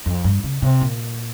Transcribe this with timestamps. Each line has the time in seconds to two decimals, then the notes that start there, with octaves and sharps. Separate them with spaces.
0.06 F2
0.24 G2
0.44 C#3
0.62 C3
0.81 A#2